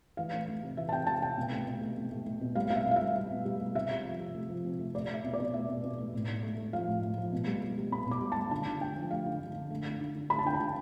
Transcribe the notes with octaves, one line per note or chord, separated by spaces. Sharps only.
E3 F5
A3
A3
C3
E3 E5
A5
C3 G5
C3 A5
C3 G5
B2
A3
B2
A3
A3
A3
A3
B2
G3 F5
G3 F5
E5
B2 F5
E5
G3
G3
B2
G3
G3
C3 E5
C3
F3
C3
A3
F3
C3
A3
A3 D5
A3 E5
B2
D5
B2
A3 E5
B2
B2
A3
A2
A2
A3
A3
F3 F5
A2
A2
F3
B2
G3
G3
G3
B2 B5
B2 D6
G3
A5
G3
D3 A5
D3
D3 G5
F3
A3 F5
D3
D3
D3
A3
A3
D3
D3
A3 B5
A5
D3 G5
A5
D3